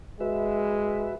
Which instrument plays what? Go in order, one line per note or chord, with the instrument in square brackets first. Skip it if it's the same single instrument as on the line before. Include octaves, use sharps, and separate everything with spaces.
[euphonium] G#3 [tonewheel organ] F#4 B4 E5